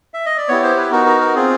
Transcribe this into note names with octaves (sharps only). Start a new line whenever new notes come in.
E5
D#5
D5
B3 E4 G4 C#5
C5
B4
B3 D#4 F#4 A#4
A#4
A#4
C4 F4 G#4